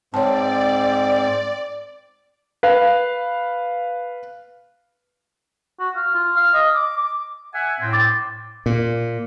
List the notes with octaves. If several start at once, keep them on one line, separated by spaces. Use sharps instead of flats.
G#2 C4 C#5 D5 A5
B4 F5
F#4
F5
F4
F5
D#5
D6
D6
E5 F#5 G#5
A2 C4
D6 A6
A#2